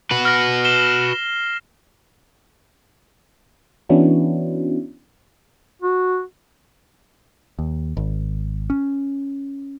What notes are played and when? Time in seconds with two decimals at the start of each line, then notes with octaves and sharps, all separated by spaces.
0.11 F#4 B4
0.25 F6 A#6
0.65 C7 E7 G7
3.89 E3 B3 C#4 D4 E4 F#4
5.82 F#4
7.59 D#2
7.97 G#1
8.70 C#4